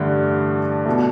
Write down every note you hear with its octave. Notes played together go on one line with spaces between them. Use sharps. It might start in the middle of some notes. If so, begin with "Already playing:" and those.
Already playing: A1 G2 D3 A3
B2 A3